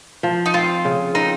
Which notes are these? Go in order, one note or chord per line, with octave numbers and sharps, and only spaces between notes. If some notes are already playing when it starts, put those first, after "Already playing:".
F3
D#4
C4 F4
C#3
C4 D#4